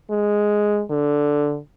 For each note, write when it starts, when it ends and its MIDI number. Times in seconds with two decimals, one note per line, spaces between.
0.11 0.82 56
0.90 1.59 50